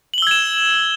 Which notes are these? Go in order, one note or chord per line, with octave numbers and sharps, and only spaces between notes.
E6 G#6 E7 F#7 G7